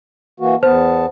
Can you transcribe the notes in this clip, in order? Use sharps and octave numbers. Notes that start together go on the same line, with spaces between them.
E3 A#3 F#4
E2 B3 C5 A5